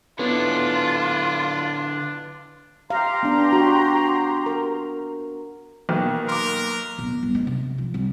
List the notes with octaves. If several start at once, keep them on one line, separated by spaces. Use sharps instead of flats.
D3 B3 D4 E4 F4 C#5
G4 F5 A#5 C6
B3 D4
F#4
A#4
B1 B2 A#3 G5
A#4 C6 D6
D1 B2
G1
G#3 D4
C3
F3
C2